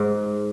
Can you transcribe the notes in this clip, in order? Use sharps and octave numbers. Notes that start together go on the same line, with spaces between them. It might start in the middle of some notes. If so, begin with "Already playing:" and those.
Already playing: G#2